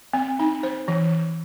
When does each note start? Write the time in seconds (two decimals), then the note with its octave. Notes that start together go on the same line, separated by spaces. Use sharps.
0.14 C4
0.39 D#4
0.63 C5
0.88 E3